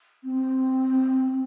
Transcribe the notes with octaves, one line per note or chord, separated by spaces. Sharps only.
C4